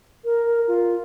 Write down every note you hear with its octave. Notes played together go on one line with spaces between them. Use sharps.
A#4
F4